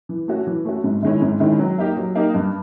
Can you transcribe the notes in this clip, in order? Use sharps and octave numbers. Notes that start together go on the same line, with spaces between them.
E3
A3 C#4 F#4
E3
A3 C#4 F#4
G#2
D#3 G#3 C#4 E4
G#2
D#3 G#3 C#4 E4
F#3
A#3 D#4 G4
F#3
A#3 D#4 G4
G2